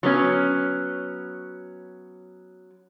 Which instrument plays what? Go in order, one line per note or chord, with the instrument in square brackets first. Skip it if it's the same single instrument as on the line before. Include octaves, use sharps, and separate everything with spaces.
[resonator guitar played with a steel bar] F#3 B3 C#4